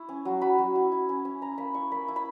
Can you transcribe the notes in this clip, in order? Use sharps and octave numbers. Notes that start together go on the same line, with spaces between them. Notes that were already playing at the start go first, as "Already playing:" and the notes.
Already playing: E4 C#6
C#4
F#3
F#3 B5
F#3
E4
E4
C#4
C#4
C#4 A#5
A#3 B5
E4 C#6
A#3 B5
E4
B5